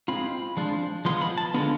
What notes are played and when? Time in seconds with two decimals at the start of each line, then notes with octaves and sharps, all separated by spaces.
0.08 G#3 C4 F4 B5
0.57 F3 G#3 D4 F4
1.05 F3 G#3 B3 F4 C6
1.21 B5
1.38 A5
1.54 D3 G#3 B3 F4